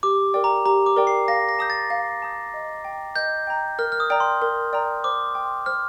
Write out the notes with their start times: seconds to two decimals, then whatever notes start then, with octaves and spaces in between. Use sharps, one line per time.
0.03 G4 D6
0.34 A#4 D5 G5
0.44 A#5
0.66 G4 A#5
0.86 D6
0.96 A#4 D5 G5
1.07 C7
1.28 F5 A#6
1.49 A#6
1.59 A5 D#6 G6
1.70 A6
1.90 F5
2.22 A5 D#6 G6
2.54 D#5
2.84 G5 A#5
3.16 D#5 G6
3.47 G5 A#5
3.79 A#4 F6
3.92 F6
4.00 D#6
4.10 D5 G5 A#5
4.20 C6
4.42 A#4
4.73 D5 G5 A#5
5.04 C5 D6
5.35 G5 C6
5.66 C5 F6